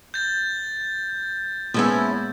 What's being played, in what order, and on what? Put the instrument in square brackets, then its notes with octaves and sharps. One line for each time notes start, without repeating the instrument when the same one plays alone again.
[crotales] G6 A6
[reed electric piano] A#2 G#3 B3 [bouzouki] F3 C#4 E4